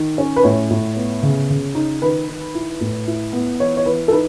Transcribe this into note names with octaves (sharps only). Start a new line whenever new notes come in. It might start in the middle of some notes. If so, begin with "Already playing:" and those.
Already playing: D#3
C#4
B4
A2 C#5
A2
B3
C#3
C#3
D#4
D#3 B4
D#3
E4
A2
E4
B3
E3 C#5
C#5
E3 B4
A4
D#4 B4